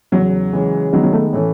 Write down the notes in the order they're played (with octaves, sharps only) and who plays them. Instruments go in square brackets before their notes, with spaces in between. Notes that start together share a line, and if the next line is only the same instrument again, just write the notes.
[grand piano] E2 C#3 E3 [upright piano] F#3
[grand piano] C#3 E3 G#3 C#4
[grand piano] D#3 G#3 B3 D#4 [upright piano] F#3
[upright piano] F#3
A3
[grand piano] A2 E3 A3 C#4